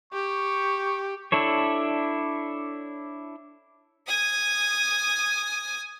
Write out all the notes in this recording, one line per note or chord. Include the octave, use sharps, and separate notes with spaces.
G4 C#6
D4 E4 A4 C#5
G#5 D#6